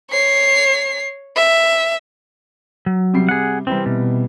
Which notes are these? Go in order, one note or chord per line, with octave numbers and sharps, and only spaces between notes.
C#5 C7
E5
F#3
C3 G3 C7
G#4 F#5
C3 E3 G3 C4
B2